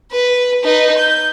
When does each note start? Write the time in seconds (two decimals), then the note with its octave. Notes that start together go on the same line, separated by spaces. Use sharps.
0.12 B4
0.64 D#4 B4
0.98 G6